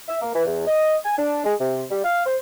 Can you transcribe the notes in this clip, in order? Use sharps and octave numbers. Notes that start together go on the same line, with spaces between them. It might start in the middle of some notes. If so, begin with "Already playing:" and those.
E5
A#3
E3
E2
D#5
G#5
D4
G#3
C3
G3
F5
C5